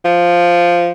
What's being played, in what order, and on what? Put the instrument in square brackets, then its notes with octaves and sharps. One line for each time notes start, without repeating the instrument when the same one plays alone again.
[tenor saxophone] F3